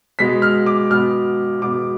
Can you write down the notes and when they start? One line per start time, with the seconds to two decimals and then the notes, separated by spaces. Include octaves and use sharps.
0.19 B2 G#3 B3 B6
0.42 F6
0.66 D6
0.91 B2 G#3 B3 F6
1.61 B2 G#3 B3 D6